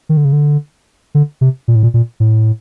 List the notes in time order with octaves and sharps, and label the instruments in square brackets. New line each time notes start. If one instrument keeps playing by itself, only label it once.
[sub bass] D#3
D3
C#3
D3
D3
C3
A#2
A2
A#2
A#2
A2